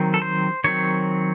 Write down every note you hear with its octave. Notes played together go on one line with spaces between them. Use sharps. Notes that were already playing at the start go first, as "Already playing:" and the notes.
Already playing: D#3 F#3 C4
A4
C5
D#3 F#3 C4 C#5